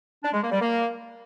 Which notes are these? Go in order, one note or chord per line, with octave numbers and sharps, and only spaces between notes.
D4
G#3
A#3
G3
A#3